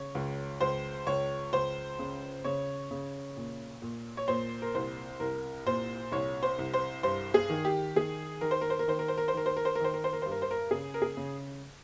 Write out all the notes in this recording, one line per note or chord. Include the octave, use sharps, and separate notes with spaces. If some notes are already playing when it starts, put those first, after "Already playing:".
Already playing: C#3 C#5
C#2
C#2 C5
C#2 C#5
C#2 C5
C#3
C#3 C#5
C#3
A#2
A#2
C#5
A#2 C5
A#4
C2 C5
C2 A#4
A#2 C5
C2 C#5
C5
C2
C5
G2 C5
G#4
D#3
G4
D#3 G#4
D#3 A#4
C5
A#4
C5
A#4
D#3 C5
A#4
C5
A#4
C5
D#3 A#4
C5
A#4
C5
A#4
D#3 C5
A#4
C5
A#4
G2 C5
A#4
C5
A#4
C#3 G#4
A#4
G#4
C#3